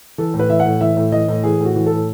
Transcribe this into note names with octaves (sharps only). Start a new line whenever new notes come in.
E3 A4
A2
B4
E3 E5
F#5
A2
E3 E5
A2
E3 D#5
A2
E3 G#4
A2
F#4
E3
A2 A4